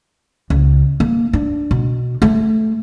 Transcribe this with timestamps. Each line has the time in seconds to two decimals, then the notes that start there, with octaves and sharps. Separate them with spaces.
0.50 C#2
1.00 A#3
1.33 D4
1.71 B2
2.22 A3